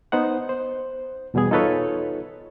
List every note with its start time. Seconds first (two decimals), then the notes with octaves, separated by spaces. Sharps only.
0.12 B3 D#4 C5 F#5
0.49 C5
1.34 E2 B2 G3 B3 G#4
1.51 D#4 F4 A4 B4 C#5